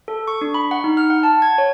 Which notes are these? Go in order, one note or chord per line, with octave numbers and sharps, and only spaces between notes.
A4
C#6
D4
B5
F#5
D#4
F6
F#5
A5
G#6
C#5